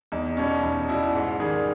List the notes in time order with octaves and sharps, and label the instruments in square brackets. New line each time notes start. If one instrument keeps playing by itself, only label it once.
[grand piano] E2 D#4
B2 G3 C#4
E2 D#4
B2 G3 E4
G#2
D#3 G3 G#4